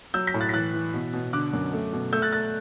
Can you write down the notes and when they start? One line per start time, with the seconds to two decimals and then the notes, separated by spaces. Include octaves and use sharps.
0.14 F#3 E6 G6
0.27 G6 B6
0.34 A2
0.40 F#6 A6
0.49 B6
0.54 E3 F#6 A6
0.73 E3
0.94 B2
1.13 B2
1.33 D3 D6 F#6
1.53 F#2
1.73 A3
1.93 B2
2.12 A3 E6 G6
2.22 F#6 A6
2.32 A3 F#6 A6